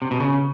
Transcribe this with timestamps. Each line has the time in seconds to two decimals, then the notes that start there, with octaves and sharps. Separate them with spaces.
0.02 C3
0.11 B2
0.20 C#3